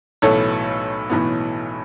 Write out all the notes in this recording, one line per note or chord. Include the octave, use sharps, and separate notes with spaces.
B1 A2 E3 B3 A4 C#5
B1 A2 E3 B3